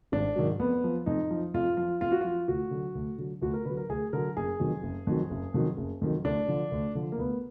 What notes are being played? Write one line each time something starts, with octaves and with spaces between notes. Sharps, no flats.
G#1 D4
G#2 D#3 F#3
F2 B3
F3
F2 D#4
F3
F2 F4
F3 F4
F2 F4
F#4
F3 F4
D2 F#4
D3 F#3
D2
D3 F#3
D2 F#4
A#4
D3 F#3 B4
A#4
D2 G#4
D3 F#3 A#4
F#1 G#4
F2 D#3 F#3
F#1
F2 D#3 F#3
F#1
F2 D#3 F#3
F#1
F2 D#3 F#3
D2 D4
D3 F3
D2
D3 F3
A#3
D2 B3